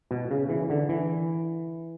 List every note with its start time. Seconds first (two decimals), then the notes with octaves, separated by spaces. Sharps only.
0.11 B2
0.31 C#3
0.49 E3
0.70 D3
0.89 E3